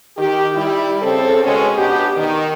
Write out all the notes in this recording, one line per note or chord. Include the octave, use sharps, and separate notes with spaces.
D#3 G4
G3 E4
C#3 C4 A4
B2 G#3 B3 C#4
B2 B3 D4 G4
D#3